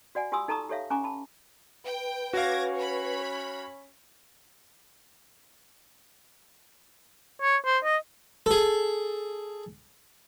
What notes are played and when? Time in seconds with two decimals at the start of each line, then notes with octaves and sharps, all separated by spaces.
0.15 F#4 D5 F#5 G#5
0.32 F4 G4 G#5 C6 D#6 E6
0.48 D#4 A4 A5 A#5 C#6 D#6
0.69 G4 A4 C#5 E5 F5
0.90 C#4 G#5 A#5 C#6 D6
1.04 A5 B5
1.84 B4 G5
2.33 C#4 F#4 F5 D6 G#6 A#6
2.75 C#5 B5
7.42 C#5
7.65 C5
7.84 D#5
8.46 G#4 A4